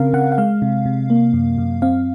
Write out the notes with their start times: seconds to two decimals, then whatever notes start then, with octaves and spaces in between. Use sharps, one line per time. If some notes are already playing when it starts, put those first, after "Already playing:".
Already playing: C#3 C4 A#4 F5
0.13 C#3 F#5
0.32 F#5
0.38 G#3 F5
0.62 C3
0.86 C3
1.10 A#3
1.33 F#2
1.58 F#2
1.82 C4 F5